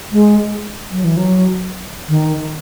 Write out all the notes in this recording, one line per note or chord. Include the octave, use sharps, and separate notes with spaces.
G#3
F#3
E3
F#3
D#3